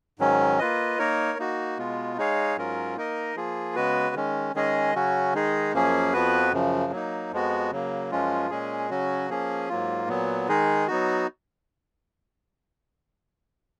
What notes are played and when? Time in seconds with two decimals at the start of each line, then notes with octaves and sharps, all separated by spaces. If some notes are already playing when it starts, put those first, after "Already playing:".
0.19 G#2 D#3 F#3 C#4
0.59 A#3 F4 B4 D#5
0.99 A#3 D#4 A#4 C#5
1.38 A#3 D#4 F#4
1.78 B2 G#3 B3 F4
2.17 G#3 D#4 G#4 C#5 F5
2.57 G#2 F#3 C#4 F4 A#4
2.96 A#3 D#4 A#4 D#5
3.36 F3 A#3 F4 G#4
3.75 C#3 G#3 B3 F#4 B4
4.15 D#3 G#3 C#4
4.54 D#3 G#3 C#4 G#4 D#5
4.94 C#3 F#3 C#4 F#4
5.34 D#3 G#3 D#4 G#4
5.73 F#2 F3 A#3 C#4 G#4
6.13 F2 F3 B3 F#4 B4
6.53 F#2 C#3 F3
6.92 F#3 A#3 D#4
7.32 F2 F3 G#3 B3 F#4
7.71 C#3 F#3 A#3
8.11 F#2 F3 G#3 C#4 F4
8.50 A#2 G#3 C#4 G#4
8.90 C#3 F#3 C#4 F#4
9.29 F3 A#3 C#4 G#4
9.69 G#2 F#3 A#3 F4
10.08 A#2 F#3 B3
10.48 D#3 G#3 D#4 G#4
10.87 F#3 B3 D#4 F#4